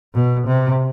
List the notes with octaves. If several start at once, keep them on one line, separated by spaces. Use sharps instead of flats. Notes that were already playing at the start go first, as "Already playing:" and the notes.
B2
C3